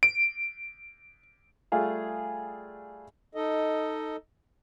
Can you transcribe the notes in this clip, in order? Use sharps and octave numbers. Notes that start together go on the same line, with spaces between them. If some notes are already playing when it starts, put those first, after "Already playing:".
D7
G3 A3 F4 G#4 F5
D#4 A4 D#5